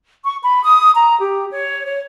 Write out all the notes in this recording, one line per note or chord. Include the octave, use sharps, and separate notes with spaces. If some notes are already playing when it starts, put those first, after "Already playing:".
C#6
B5
D#6
A#5
G4
C#5
C#5